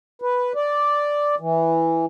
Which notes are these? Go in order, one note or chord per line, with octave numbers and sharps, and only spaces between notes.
B4
D5
E3